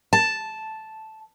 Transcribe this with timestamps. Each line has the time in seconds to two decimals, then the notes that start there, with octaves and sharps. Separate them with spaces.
0.13 A5